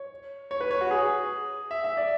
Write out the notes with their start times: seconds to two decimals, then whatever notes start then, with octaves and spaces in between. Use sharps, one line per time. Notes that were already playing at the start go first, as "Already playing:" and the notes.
Already playing: C#5
0.51 C#5
0.61 B4
0.71 C#5
0.81 F#4
0.91 G#4
1.71 E5
1.84 E5
1.97 D5